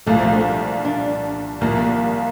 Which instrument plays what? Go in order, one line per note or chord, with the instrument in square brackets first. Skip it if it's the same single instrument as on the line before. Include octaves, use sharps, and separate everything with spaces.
[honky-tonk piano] C2 A#2 F3 [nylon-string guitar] A3
[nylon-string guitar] C4
D4
D4
[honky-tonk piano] C2 A#2 F3 [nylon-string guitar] A#3